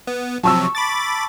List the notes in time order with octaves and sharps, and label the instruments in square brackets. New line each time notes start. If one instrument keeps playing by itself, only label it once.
[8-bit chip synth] B3
[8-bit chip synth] C3 F3 F#3 [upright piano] A5 C#6 E6
[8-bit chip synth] B5 D6 A6